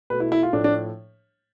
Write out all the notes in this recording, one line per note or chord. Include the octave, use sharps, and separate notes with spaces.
B2 A3 B4
E4
E4
F4
A2 F3 A3 D4
D4